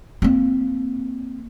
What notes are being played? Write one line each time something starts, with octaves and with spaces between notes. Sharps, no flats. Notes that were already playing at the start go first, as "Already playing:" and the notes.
A#3 C4